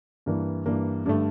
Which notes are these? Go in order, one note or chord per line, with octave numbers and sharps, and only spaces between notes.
G2 E3 A#3
G2 E3 A#3
G2 D3 A3